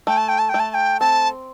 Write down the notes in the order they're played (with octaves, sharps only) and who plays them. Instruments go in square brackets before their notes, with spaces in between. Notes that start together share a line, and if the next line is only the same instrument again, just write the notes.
[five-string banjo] A3 [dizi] G5
[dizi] A5
G5
A5
[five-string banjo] A3 [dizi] G5
[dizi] A5
A5
G5
[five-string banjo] C4 [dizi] A5